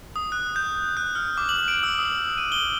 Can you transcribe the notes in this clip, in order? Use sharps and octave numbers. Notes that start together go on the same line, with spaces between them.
D#6
F#6
G6
F#6
F6
D6
F#7
D7
E6
D#6
D#7
G7